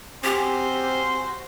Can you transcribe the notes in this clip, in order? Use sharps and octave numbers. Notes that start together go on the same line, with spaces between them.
C4 C#4 F#4 G4 C5 C6